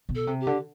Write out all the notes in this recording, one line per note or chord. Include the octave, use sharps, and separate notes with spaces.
B2
A4
C3
G4
D3